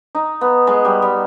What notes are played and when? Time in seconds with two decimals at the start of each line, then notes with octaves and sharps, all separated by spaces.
0.15 D#4
0.41 B3
0.67 G#3
0.85 G3
1.02 G3